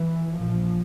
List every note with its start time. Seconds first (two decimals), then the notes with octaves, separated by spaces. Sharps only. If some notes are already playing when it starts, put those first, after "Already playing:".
Already playing: E3
0.36 A#1 A#2 F3